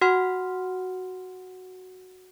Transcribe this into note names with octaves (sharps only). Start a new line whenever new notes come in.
F#4 F#5 C6 F6